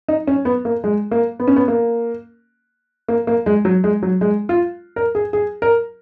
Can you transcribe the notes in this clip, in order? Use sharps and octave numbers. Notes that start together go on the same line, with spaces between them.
D#4
C#4
B3
A#3
G#3
A#3
B3
C#4
B3
A#3
A#3
A#3
G#3
F#3
G#3
F#3
G#3
F4
A#4
G#4
G#4
A#4